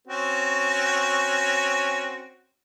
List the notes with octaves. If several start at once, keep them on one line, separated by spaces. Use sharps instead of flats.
C4 C#4 F#4